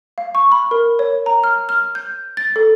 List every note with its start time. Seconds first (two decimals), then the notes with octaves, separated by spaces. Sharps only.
0.18 F5
0.35 C#6
0.52 B5
0.71 A#4
0.99 C#5
1.26 A#5
1.44 F6
1.69 F6
1.95 G6
2.37 A6
2.56 A4